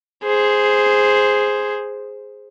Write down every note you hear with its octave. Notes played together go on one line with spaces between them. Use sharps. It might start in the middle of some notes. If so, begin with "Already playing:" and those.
G#4 C5